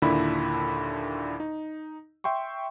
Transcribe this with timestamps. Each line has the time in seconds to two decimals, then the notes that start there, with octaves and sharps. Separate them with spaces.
0.02 D#2 A#2 D3 D4 E4 B5
1.40 D#4
2.24 E5 G5 C6 C#6